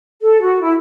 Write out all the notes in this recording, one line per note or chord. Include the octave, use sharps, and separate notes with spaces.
A4
F#4
E4